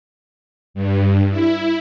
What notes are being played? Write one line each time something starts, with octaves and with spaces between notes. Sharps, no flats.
G2
E4